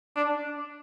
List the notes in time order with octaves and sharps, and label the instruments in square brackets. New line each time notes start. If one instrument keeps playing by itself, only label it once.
[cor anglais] D4